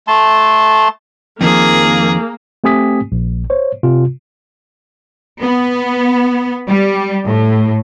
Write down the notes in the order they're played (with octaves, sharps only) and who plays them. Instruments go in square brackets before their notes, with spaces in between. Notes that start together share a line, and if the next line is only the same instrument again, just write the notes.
[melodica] A3 A5 C6
[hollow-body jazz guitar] F2 D#3 F3 [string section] A#3 [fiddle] G#4
[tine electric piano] A3 C4 G4 G#5 D#6 B6
A#1
C5 C#5
C3 F4
[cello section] B3
G3
A2